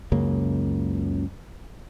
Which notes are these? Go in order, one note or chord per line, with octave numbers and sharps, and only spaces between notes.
C#2 F#2 C#3 A#3